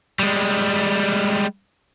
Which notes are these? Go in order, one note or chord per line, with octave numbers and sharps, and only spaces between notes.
G3 G#3